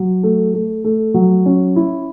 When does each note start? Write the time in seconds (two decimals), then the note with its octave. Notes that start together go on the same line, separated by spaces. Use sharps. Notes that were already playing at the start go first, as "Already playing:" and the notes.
Already playing: F#3
0.23 A3
0.54 A3
0.84 A3
1.14 F#3
1.45 C#4
1.76 E4